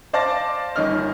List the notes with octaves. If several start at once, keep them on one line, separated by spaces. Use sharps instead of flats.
C5 D5 F5 A5 A6 A#6
G1 D#3 C#4 D#5 F6